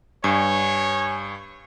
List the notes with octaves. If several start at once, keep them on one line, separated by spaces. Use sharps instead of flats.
G2 C#5 G#5